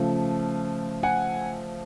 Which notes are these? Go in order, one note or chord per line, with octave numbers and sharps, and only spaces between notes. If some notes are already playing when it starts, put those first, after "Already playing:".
Already playing: C#3 F3 A3
F#5 G#5